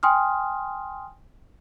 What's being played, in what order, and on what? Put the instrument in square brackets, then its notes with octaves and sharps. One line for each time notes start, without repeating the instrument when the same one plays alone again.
[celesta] G5 G#5 C6 D#6 F6